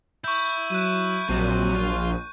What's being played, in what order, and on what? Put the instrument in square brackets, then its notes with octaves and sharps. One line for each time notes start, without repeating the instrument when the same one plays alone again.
[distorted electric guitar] E4 [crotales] C#6 G6
[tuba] F#3 [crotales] F#6 D#7
[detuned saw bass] A#1 [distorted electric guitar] C3 [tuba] F#3
[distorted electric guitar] F4